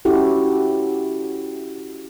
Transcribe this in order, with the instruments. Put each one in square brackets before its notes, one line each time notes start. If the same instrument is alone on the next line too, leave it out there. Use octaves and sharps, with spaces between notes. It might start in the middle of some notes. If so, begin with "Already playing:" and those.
[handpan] C#4 E4 F#4 G4 A4